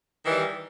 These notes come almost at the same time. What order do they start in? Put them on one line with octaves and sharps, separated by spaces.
D#3 E3 G3